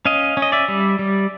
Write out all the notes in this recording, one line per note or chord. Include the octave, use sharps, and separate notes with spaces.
C#4 D#5 F5
C#4
D#5
D5 E5
G3
G3